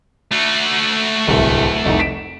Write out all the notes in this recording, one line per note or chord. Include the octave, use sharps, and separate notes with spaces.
A3 F#4
D1 C2
F1 C2 D#4
B6 D7 E7